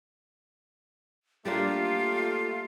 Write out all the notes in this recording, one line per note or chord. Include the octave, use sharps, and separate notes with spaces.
G3 A3 A#3 D4 F4 G4